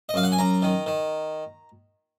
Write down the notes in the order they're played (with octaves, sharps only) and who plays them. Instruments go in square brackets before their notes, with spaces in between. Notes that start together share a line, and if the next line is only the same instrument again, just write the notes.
[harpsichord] D#5
F#2 F5
F#5
G#5
F#2 A#5
D#3
D#3